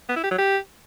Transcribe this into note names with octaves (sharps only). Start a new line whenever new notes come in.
B3
E4
G4
F#3
G4